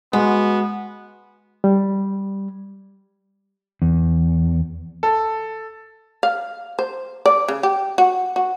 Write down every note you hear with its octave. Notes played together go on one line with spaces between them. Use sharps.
G#3 B3 F#4
G3
E2
A4
F5
C5
D5
C#3
G4
F#4
F#4